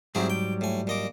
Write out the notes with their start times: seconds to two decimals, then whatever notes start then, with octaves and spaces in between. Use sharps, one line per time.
0.15 G#2 F#3 G3 C4 E4 G#4
0.30 G5
0.61 A2 G#5
0.87 A#2 D#5 D6